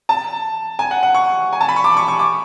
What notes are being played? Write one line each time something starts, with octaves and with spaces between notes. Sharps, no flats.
A5
G#5
F#5
F#5
C#6
G#5
A5
B5
C#6
D6
C#6
C#6
D6